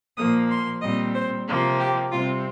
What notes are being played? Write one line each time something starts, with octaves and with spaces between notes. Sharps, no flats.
A#2 F3 A#3 D#6
C6
A#2 G3 C4 D#5
C5
C3 F3 A#3
G4
C3 G3 C4 F4